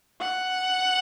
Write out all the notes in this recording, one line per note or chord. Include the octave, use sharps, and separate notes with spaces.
F#5